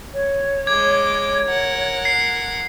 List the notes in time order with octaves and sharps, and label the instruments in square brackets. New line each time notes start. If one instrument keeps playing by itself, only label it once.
[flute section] C#5
[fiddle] G#3 D6 [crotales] G#6
[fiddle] A#4 F#5
[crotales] C7